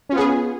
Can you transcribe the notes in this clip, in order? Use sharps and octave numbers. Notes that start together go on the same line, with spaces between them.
B3 C#4 F4 G#4